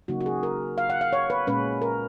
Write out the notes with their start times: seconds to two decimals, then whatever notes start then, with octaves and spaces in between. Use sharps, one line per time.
0.08 C#3 F#3 A#3 D#4 F#4
0.21 F#4
0.26 G#4
0.43 A#4
0.78 F5
0.90 F#5
1.01 F5
1.13 C#5
1.30 B4
1.47 A#2 G#3 C#4 B4
1.82 A#4